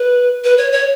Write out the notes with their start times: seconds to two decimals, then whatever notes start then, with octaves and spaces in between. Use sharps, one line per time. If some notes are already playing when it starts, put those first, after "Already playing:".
Already playing: B4
0.44 B4
0.58 C#5
0.72 C#5